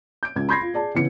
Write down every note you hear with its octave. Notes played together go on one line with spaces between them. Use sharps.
G6 D7
C#2 G#6
B5 C6 G6 G#6 A#6 C7
F4
G#4 D5 A5
C#3 E3 B3 C#7